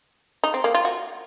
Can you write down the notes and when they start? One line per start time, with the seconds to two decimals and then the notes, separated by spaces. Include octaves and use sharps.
0.44 D#4
0.54 C4
0.64 A#3
0.75 F4
0.85 F#4